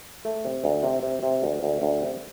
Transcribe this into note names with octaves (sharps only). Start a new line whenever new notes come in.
A3
C3
D2
C3
C3
C3
D2
D2
D2
C3